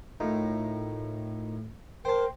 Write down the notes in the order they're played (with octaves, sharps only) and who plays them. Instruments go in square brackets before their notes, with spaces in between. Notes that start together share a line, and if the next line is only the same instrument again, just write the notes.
[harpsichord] A2 [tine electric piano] D#4 F4 A#4
[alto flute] A#4 [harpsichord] C5 A5 [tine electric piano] G5 C6